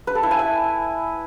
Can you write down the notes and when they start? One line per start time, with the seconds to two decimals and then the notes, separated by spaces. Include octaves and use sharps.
0.07 B4
0.15 A4
0.23 E4
0.31 G#5
0.39 E5